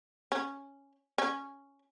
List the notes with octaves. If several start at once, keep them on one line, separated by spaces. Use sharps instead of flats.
C#4
C#4